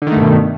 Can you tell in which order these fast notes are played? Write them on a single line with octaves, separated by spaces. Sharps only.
D3 D#3 A3 G2 B2